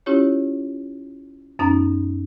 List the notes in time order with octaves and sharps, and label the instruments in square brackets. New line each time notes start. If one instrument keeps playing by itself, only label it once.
[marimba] C#4 E4 F4 G4 C#5
F#2 B3 C#4 D#4 A#5